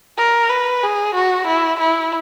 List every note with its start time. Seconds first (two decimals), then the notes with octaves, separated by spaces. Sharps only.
0.18 A#4
0.50 B4
0.83 G#4
1.14 F#4
1.47 E4
1.80 E4